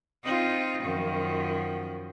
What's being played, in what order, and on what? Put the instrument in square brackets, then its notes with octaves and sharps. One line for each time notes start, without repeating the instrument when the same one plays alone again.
[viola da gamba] C4 D#4 F4
F#2 D#3 F3